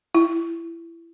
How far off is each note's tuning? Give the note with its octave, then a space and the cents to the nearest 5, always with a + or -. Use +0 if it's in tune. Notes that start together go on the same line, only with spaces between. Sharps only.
E4 +25